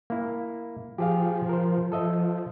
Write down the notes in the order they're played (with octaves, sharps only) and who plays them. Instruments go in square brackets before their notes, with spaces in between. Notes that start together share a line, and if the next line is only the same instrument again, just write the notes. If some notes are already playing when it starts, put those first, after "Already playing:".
[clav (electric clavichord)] A#3 E4
[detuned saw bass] F3 [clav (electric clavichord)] G4 G#4 F5
[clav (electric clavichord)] A#4 C5
[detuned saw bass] F3 [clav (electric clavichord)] A4 D#5 E5